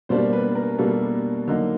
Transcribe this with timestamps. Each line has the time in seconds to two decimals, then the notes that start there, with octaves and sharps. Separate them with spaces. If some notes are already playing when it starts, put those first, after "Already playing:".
0.09 B2 G3 A#3 D4 C5
0.33 B4
0.55 A#4
0.78 B2 G3 A#3 D4 A4
1.48 D3 F#3 A#3 D#4